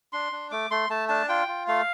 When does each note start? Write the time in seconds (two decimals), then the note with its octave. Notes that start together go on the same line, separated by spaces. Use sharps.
0.13 D4 C6
0.32 D4
0.51 A3 D6
0.71 A3 C6
0.90 A3 A5
1.09 D4 A5
1.29 F4 G5
1.48 F4
1.68 A3 F5